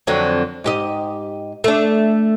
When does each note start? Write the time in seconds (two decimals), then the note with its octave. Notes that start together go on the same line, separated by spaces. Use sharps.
0.07 F2 D3 F#3
0.64 G#2 G4 D#5
1.64 A3 D4